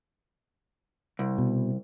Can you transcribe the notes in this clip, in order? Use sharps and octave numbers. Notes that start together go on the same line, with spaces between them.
C2
B2